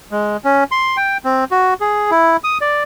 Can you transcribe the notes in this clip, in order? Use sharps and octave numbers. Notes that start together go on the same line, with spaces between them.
G#3
C#4
C6
G5
C4
F#4
G#4
E4
D#6
D5